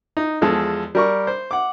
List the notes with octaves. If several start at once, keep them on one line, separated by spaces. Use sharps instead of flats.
D#4
E2 F3 G#3 A4
G3 A#4 C#6
C5
F#5 D6